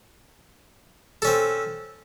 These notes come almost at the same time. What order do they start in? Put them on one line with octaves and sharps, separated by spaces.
A4 C#4 C4